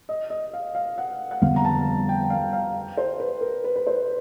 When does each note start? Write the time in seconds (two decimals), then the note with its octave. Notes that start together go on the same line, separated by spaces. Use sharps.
0.09 D#5
0.30 D#5
0.53 F5
0.75 F5
0.98 F#5
1.31 F#5
1.42 F2 D3 G3 B3 F5
1.56 A#5
1.65 A5
2.09 G5
2.30 F5
2.53 F5
2.97 C5
3.20 B4
3.41 A#4
3.64 B4
3.76 B4
3.87 C5